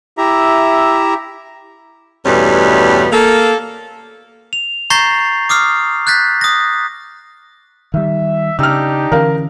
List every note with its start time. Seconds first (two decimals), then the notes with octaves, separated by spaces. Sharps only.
0.18 E4 G4 E5 A#5
2.26 E2 G2 B2 G3 A3 C#4
3.12 A#3 A4
4.53 F7
4.90 A#5 C#6 G6 A6 A#6 C7
5.49 D6 D#6 F6 C7
6.07 F#6 G6 A6 B6
6.41 D#6 A#6
7.94 D#3 G3 E5
8.59 C#3 D4 D#4 G4 E6 F6
9.12 D3 E3 C#4 A#4 F5